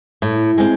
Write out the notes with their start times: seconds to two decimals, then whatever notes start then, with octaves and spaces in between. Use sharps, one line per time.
0.22 A2
0.58 G#3 C4